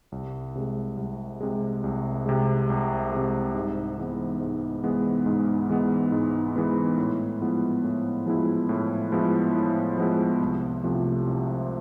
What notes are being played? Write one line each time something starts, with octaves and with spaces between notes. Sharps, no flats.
C2
C3 G#3
C2
C3 G#3
C2
C3 G#3
C2
C3 G#3
G#2
E3 G#3 B3
G#2
E3 G#3 B3
G#2
E3 G#3 B3
G#2
E3 G#3 B3
A2
F3 G#3 B3 E4
A2
F3 G#3 B3 E4
A2
F3 G#3 B3 E4
A2
F3 G#3 B3 E4
C2
C3 F3 A3
C2